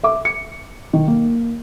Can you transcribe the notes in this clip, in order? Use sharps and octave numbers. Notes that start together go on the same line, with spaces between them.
E5 D6
C#7
D#3
A#3